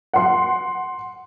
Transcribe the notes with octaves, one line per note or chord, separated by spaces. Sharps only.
F#5 C6